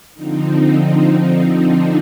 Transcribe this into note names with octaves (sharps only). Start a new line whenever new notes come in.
D3 F3 C4 D#4
D4